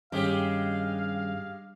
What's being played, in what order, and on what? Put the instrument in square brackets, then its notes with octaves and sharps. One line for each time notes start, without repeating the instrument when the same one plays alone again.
[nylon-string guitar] G2 [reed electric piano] D#3 C#4 G#4 [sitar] G#3 G4 [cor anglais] F5